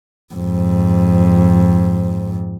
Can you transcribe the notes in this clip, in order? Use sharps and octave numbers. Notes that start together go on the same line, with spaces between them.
F2 G#2